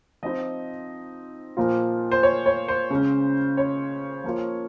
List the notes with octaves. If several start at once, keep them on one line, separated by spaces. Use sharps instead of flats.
F3 C4 D#4 D#5
A#2 F3 A#3 F4
C5
C#5
C#5
C5
C#3 G#3 C#4
C#5
F3 A#3 F4